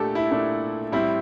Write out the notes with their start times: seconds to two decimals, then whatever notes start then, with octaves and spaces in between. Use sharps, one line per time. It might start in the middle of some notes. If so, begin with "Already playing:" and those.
Already playing: A#2 A3 D4 G4 A4
0.15 E4
0.31 A#2 A3 D4
0.92 A2 G3 C4 E4